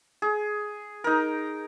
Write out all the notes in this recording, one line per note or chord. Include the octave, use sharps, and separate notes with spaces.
G#4
D#4 A#4